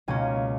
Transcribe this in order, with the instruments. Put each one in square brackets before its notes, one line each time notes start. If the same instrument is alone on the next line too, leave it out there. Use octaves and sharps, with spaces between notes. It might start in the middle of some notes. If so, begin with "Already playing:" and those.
[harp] C#2 B2 A#3 C#4 G#5